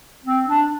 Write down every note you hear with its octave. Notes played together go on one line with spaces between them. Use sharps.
C4
D4